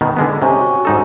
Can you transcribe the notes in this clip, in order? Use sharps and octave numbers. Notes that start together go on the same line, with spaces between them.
B2 D#3
D3 G#3 B3
C3 C#4 G4 D#5
F#4
G#2 D#4 A4